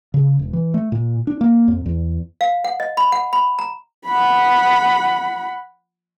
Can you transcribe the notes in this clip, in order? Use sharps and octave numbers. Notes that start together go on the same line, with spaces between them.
C#3
E1
E3
A3
A#2
D4
A#3
F2
E2
F5
F#5
D#5
B5
F#5
B5
A#5
F#5 B5